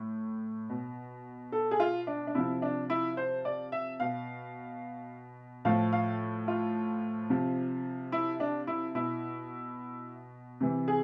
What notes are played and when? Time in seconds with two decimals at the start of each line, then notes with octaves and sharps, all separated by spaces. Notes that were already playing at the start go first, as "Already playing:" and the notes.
Already playing: A2
0.69 B2
1.52 A4
1.71 G#4
1.80 F4
2.07 D4
2.27 D4
2.35 C3 F3 E4
2.62 D4
2.90 E4
3.17 C5
3.45 D5
3.72 E5
4.00 B2 F5
5.65 A2 F3 F5
5.93 F5
6.48 F4
7.30 C3 F3
8.12 E4
8.40 D4
8.67 E4
8.95 B2 E4
10.61 C3 E3
10.88 G#4